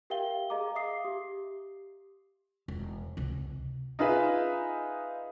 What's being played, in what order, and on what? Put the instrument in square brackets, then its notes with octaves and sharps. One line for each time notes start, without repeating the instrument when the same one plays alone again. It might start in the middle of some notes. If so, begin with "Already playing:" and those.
[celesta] G4 A#4 E5 F5 G5 G7
G#4 D#5 F5 A#5 D6
E5 F5 D6 D#6 C7
G4
[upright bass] E1
C#2 C3
[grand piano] D#4 F4 G#4 B4 E5